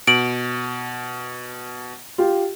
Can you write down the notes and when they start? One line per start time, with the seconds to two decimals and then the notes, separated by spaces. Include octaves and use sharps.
0.07 B2 D7 F#7
2.18 F4 G4